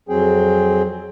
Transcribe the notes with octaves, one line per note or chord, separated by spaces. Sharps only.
F2 F#3 C4 G#4 G5